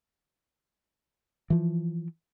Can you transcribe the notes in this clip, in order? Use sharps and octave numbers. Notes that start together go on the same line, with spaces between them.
E3 F3